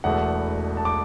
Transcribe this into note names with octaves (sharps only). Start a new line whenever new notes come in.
E1 E2 B2 A3 F#5
A5
D6